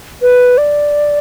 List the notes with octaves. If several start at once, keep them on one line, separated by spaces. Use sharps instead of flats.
B4
D5